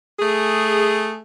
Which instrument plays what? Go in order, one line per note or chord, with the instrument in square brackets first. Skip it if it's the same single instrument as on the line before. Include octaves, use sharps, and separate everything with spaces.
[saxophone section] A3 G#4